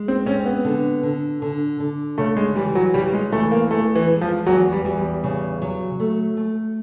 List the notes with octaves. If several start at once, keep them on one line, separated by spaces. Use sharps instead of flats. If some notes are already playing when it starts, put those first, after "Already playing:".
Already playing: G#3
C4
C4 C#4
B3
D3
D3
D3
D3
C#3 A3
G#3
E3 G3
F#3
C#3 G3
G#3
E3 A3
A#3
E2 A3
E3
G#3
F3
E2 F#3
G3
E2
G3
C#3
F#3
A3
A3